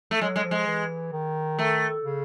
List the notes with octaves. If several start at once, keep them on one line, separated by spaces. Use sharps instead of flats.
A3
F#3 G#3
G#3
F3
G#3
E3
D#3
A3
C#3